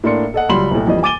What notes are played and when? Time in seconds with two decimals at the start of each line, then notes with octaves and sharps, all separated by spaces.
0.04 A2 A#3 D4 C6 C#7
0.34 A4 D#5 F#5
0.49 C#2 F#3 G3 B5 C6 F#7
0.71 B1 A2
0.87 F2 E3 G3 D#5
1.03 G#5 D6 A6 D#7 G7